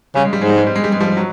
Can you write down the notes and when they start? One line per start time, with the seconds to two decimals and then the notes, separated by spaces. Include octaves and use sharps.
0.15 C#3 G3
0.25 G#3
0.33 G3
0.41 G#2 G#3
0.50 G3
0.58 G#3
0.67 G3
0.75 G#3
0.84 G3
0.92 G#3
1.01 F3 G3
1.17 F#3